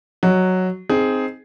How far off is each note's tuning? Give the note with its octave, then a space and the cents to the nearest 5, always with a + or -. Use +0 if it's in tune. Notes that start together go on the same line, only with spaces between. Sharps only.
F#3 +0 D#5 +0
C4 -5 D#4 +0 G#4 +10